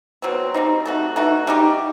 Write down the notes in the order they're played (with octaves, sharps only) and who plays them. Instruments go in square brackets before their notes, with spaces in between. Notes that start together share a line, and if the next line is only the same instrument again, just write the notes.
[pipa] B2 F#3 C4
G3 C4 D#4
A3 D#4 F#4
E3 A3 D#4 F#4
G3 D#4 G4